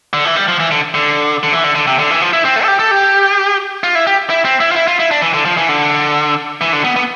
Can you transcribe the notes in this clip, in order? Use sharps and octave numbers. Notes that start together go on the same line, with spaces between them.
D3
E3
G3
F3
E3
D3
D3
D3
E3
D3
D3
C3
D3
E3
F3
E4
C4
A3
A4
G4
A4
G4
F4
E4
G4
E4
C4
E4
F4
E4
F4
E4
D4
E3
D3
F3
E3
D3
E3
D3
B3
B3